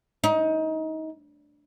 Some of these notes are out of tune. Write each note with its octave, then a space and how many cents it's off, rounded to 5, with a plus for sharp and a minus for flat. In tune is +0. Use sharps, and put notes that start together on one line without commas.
D#4 +25